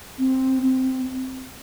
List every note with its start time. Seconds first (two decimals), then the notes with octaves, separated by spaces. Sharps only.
0.18 C4
0.63 C4